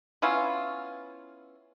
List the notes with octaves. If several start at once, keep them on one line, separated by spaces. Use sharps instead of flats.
B3 C#4 E4 F4